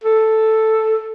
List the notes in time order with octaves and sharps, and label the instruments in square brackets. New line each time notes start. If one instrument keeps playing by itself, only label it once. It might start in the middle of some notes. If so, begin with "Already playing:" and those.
[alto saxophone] A4